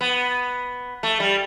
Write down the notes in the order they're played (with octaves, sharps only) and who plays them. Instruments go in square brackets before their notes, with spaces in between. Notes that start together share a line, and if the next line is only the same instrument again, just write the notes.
[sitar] B3
A3
G3